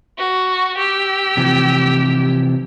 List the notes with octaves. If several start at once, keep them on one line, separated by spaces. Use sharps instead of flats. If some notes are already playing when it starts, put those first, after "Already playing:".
F#4
G4 E6
C3 E3 F3